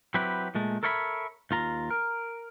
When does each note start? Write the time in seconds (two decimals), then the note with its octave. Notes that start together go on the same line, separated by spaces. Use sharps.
0.14 F#3 C4 E4 G4 B4
0.55 A#2 G#3 A3
0.83 A4 A#4 C#5 E5 A#5 B5
1.51 D#2 F4 A#5
1.91 A#4